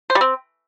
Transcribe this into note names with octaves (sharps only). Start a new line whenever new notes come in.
C5
G3
C4